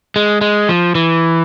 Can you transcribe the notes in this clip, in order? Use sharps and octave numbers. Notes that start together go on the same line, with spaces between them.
G#3
G#3
F3
E3